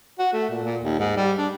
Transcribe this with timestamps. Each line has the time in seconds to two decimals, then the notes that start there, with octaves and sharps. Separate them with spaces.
0.19 F#4
0.33 A3
0.50 A#2
0.64 A#2
0.83 D#2
0.99 G#2
1.17 G3
1.38 D4